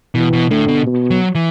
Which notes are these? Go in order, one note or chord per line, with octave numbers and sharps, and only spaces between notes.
B2 E3
B2
A2 D3
B2
B2
F#3
E3